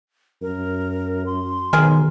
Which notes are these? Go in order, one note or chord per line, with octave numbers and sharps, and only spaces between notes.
F#2 A#4
C6
B1 D#3 G#4 A#4